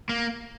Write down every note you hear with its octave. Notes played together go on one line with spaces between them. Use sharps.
A#3